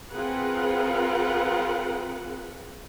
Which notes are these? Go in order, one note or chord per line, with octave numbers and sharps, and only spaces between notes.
C4 F4 G#4 A#4 B4 F#5